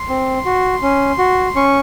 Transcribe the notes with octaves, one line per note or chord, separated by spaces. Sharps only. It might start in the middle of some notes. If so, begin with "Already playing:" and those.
Already playing: C6
C4
F#4
C#4
F#4
C#4 C#6